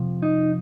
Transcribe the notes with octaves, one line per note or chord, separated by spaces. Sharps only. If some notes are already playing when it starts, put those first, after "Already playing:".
Already playing: F2 C3 F3
D#4